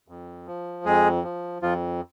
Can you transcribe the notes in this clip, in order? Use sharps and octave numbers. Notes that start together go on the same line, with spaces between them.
F2
F3
F2 G#3 G#4
F3
F2 F3 F4